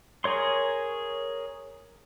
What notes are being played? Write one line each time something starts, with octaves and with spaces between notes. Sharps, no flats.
G#4 A#4 C#5 C6